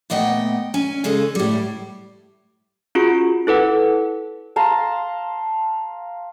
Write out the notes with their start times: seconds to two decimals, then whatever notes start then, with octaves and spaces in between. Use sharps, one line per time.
0.10 A#2 A3 B3 D#5 F#5 G5
0.74 C#4 G#5
1.04 C#3 G#3 G#4 A4
1.35 A2 G3
2.95 C#4 F4 F#4 G#4 D7
3.47 E4 A4 B4 F#5
4.56 F5 A5 A#5 C6